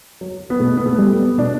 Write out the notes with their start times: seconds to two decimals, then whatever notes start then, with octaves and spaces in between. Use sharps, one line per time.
0.21 F#3
0.50 B3
0.60 B2 A3
0.77 B3
0.86 A3
0.98 G3
1.12 B3
1.38 B2 D4